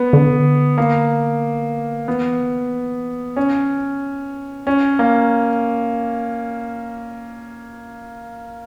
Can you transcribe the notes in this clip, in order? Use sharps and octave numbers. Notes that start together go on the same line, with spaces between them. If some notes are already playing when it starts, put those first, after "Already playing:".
Already playing: B3
D3
A#3
E3 B3
D3
E3
C#3 C#4
G2
A#2 C#4
A#3
B2